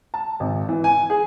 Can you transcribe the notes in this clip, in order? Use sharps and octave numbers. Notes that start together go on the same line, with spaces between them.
A5
G#1
E3
G#5
G#4